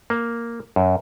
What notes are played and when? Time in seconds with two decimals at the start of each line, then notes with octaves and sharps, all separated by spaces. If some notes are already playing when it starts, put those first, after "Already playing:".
0.10 A#3
0.76 F#2